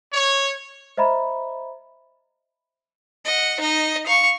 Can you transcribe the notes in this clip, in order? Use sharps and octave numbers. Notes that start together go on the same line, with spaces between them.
C#5
C5 D#5 E5 A#5 B5
D#5 F#5
D#4 D#5
F5 C#6